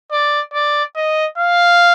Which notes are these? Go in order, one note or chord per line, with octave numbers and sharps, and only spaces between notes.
D5
D5
D#5
F5